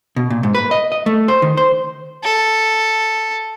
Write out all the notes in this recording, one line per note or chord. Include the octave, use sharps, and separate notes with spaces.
B2
A#2
G#2
B4
D#5
D#5
A3
C5
D#3
C5
A4